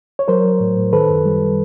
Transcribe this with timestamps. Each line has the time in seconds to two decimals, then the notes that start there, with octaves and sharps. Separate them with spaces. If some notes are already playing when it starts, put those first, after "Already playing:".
0.19 C#5
0.28 F#3 A#4 C5
0.45 F#3
0.60 A2
0.77 A2
0.93 D#3 A4 B4
1.08 F#2
1.25 G3